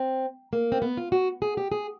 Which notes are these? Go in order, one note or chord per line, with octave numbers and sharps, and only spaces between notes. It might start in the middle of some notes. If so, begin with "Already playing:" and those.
Already playing: C4
A#3
C4
B3
F4
F#4
G#4
G4
G#4